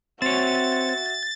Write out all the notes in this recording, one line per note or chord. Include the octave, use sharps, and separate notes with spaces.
C4 F#4 C#5 E5 A6